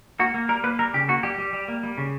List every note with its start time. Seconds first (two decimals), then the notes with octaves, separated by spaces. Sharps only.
0.20 A#3 F#4
0.34 A#3
0.49 G3 A#4
0.64 A#3 B4
0.79 G3 A#4
0.94 C#3 G4
1.08 A#3 F#4
1.23 G3 G4
1.38 G3
1.53 G3
1.68 A#3
1.83 G3
1.98 C#3